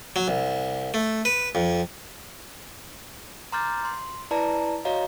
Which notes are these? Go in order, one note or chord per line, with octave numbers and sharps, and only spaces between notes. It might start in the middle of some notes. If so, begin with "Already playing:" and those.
F#3
C2
A3
B4
F2
A#5 C6 D6 F6 G6 A6
C6
E4 B4 D5 A5 A#5
F#4 C#5 D#5 F5 A#5